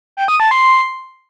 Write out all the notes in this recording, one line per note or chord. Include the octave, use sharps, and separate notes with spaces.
G5
D#6
A5
C6